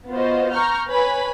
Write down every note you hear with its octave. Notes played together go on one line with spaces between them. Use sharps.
B3 F4 F#4 C5 D#5
A#5 C#6 F6 G6
B4 C#5 G#5 B5